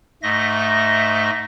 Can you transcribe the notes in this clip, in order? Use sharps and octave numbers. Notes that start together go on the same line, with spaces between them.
G#2 A3 D#5 E5 A#6